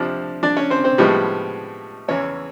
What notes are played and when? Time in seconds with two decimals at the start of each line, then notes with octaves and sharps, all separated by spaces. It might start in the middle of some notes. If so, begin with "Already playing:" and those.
Already playing: F2 C3 F3 D4 D5
0.43 D4 D5
0.57 C#4 C#5
0.70 C4 C5
0.84 C4 C5
0.98 A2 F3 G3 G#3 B3 G4
2.08 E2 C#3 E3 C#4 C#5